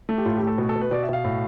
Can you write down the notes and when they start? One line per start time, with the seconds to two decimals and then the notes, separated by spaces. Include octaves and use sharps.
0.09 A3
0.18 G4
0.25 A2 F4
0.37 G4
0.42 A3 A4
0.58 B2
0.69 A4
0.75 B2
0.81 B4
0.91 B2 D5
1.03 E5
1.09 B2 F5
1.24 A2